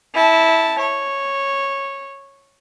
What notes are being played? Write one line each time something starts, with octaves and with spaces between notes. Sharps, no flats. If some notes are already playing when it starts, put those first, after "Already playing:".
E4 A5
C#5